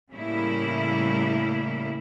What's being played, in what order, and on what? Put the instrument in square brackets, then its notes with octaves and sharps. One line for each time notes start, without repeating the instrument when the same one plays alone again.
[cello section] A2 C#3 G3 A#3 E4